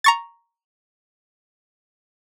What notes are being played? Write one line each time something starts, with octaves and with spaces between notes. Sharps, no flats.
A#5 C#6 A6